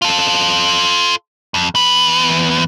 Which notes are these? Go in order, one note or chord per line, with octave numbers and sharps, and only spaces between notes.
F4 A4
F2
E2 B4